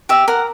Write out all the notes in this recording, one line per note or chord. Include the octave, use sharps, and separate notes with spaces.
G4 E5
A#4 F#5